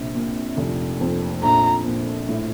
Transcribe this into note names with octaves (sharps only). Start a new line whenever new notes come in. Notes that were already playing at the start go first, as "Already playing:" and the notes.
Already playing: A#1 C3
A#2
F1
F2
A#1 A#5
A#2
A2